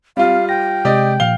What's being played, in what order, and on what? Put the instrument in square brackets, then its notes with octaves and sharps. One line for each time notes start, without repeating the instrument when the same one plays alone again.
[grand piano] G3 F4 [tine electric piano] C4 [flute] F5
[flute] G5 [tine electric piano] A#6
[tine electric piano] C3 G#3 [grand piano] G4 D5 D#5
[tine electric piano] A#2 F3 [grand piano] F5 G7